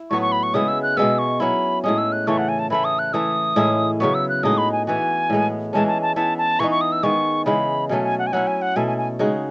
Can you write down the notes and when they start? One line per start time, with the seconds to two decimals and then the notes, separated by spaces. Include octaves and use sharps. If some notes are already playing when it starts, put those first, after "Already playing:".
Already playing: E4
0.10 A2 F#3 B3 F#4 C#6
0.22 C#6
0.32 B5
0.43 C#6
0.54 C#3 G#3 B3 E4 D#6
0.68 E6
0.83 F#6
0.97 B2 G#3 B3 E6
1.19 C#6
1.40 F#3 C#4 E4 B5
1.84 A2 G#3 C#4 D#6
1.98 E6
2.12 F#6
2.27 C#3 E3 A3 C#6
2.38 F#5
2.49 G#5
2.59 A5
2.70 E3 A3 E4 B5
2.85 D#6
2.99 F#6
3.13 E3 A3 E4 D#6
3.56 A2 G#3 C#4 E4
4.00 C#3 F#3 B3 C#6
4.14 E6
4.29 F#6
4.43 A2 G#3 D#4 F#4 D#6
4.58 B5
4.72 G#5
4.87 E3 B3 F#4 G#5
5.30 A2 G#3 B3
5.73 E3 G#3 C#4 A5
5.88 A5
6.02 A5
6.16 E3 B3 E4 A5
6.38 A5
6.60 E3 B3 D#4 C#6
6.71 C#6
6.81 D#6
6.92 E6
7.03 D#3 G#3 B3 C#6
7.46 C#3 E3 G#3 B5
7.89 B2 F#3 A3 C#4 G#5
8.04 G#5
8.19 F#5
8.27 G#5
8.33 F#3 C#4 E4 F#5
8.47 G#5
8.62 F#5
8.76 B2 A3 E4 G#5
8.87 G#5
8.98 G#5
9.19 C#3 G#3 D#4 F#4